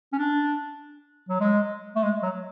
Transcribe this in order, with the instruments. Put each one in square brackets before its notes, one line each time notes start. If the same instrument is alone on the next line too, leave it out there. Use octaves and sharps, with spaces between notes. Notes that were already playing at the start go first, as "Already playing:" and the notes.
[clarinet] C#4
D4
F#3
G#3
A3
G#3
F#3